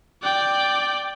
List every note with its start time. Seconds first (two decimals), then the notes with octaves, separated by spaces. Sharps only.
0.23 D5 G5